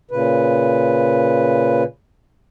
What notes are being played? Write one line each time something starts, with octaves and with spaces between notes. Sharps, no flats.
A#2 C#3 B4